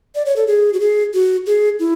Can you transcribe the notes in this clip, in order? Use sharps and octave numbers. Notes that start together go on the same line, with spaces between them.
D5
C#5
A4
G#4
F#4
G#4
F#4
G#4
E4